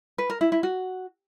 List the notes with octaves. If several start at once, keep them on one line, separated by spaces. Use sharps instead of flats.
B4
A#4
E4
E4
F#4